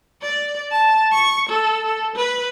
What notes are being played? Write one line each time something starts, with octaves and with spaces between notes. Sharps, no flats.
D5
A5
C#6
A4
A4
B4